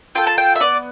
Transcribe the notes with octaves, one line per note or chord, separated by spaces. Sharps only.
F4 A4 G5
A5
G5
E5
B3 D5